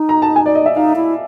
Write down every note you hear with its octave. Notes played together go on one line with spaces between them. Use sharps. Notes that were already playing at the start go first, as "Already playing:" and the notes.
Already playing: D#4
A#5
A5
G#5
D5
D#5
E5
D#4 F5
E4